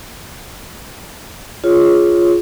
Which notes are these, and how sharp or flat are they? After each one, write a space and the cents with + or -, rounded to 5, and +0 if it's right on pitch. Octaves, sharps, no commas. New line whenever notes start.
F4 +0 G#4 +0 C#5 +0